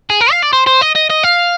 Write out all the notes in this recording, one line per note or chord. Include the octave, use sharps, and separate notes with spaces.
G#4
A#4
F5
D5
C5
C5
D#5
D#5
D#5
F5